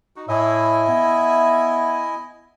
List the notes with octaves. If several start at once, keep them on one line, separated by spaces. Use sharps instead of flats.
D#4 F#4
A2 E4 D#5 E5 G#5
B3